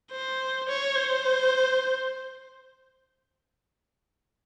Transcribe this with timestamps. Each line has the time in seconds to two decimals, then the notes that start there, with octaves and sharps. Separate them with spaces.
0.12 C5
0.69 C#5
0.96 C5